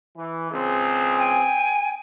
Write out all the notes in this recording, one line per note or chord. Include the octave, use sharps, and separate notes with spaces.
E3
C#2 C4 G#4
G5 G#5